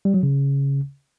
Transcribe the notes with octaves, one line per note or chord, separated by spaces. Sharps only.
G3
F#3
C#3